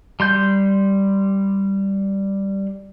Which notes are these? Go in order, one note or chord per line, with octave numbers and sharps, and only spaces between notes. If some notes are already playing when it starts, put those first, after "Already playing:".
G3 C6 G6